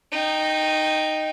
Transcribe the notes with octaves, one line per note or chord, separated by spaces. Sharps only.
D#4 G5